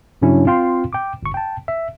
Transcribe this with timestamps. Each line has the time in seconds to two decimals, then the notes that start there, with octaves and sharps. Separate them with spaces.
0.22 G2 C#3 F#3 C#4 D4 E4
0.47 C4 F4 F5 G5 C6
0.93 G5 D6
1.23 G1 C#6
1.34 G5 A5
1.68 E5